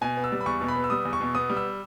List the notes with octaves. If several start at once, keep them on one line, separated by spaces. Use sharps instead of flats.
B2 G#5
B3
E6
G3
B5
E2 C#6
B2
B5
B3
E6
G3 D#6
E2
C#6
B2
B3 D#6
G3
E6